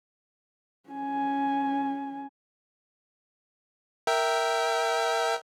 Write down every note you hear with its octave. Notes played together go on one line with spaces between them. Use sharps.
C#4 G#5
A#4 E5 G5